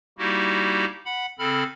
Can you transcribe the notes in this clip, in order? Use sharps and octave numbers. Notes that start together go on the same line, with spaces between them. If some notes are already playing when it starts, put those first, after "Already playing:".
G3 A#3 D#4 E4 F#4 G4
F#5 B5
C#3 C4 A4 B5 F6